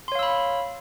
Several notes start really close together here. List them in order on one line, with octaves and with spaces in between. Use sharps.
C6 C#5 F5 E6 B5